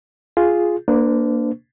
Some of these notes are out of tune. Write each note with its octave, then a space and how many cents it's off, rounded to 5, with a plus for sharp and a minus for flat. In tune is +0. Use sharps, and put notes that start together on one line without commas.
F4 +0 G#4 +0
A#3 +0 D4 +0 C5 -45